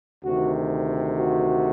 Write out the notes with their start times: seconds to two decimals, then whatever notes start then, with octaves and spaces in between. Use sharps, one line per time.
0.23 D2 C3 D#3 F#4
1.16 F#4